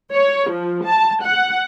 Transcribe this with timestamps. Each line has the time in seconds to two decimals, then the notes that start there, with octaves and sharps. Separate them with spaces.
0.11 C#5
0.49 F3
0.85 A5
1.22 F#5